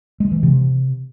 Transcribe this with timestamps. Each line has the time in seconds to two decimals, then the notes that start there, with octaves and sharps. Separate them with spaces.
0.20 G#3
0.32 E3
0.43 C3